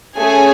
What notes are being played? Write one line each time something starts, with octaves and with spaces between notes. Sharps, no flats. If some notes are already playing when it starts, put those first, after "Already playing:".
A3 C#4 G#4 G#5